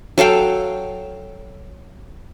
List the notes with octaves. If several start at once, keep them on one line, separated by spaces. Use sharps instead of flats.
F#3 A4 F5 G5